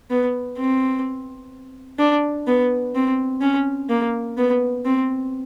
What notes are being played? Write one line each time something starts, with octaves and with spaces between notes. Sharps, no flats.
B3
C4
D4
B3
C4
C#4
A#3
B3
C4